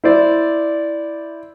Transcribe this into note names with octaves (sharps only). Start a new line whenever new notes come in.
E4 C5 D5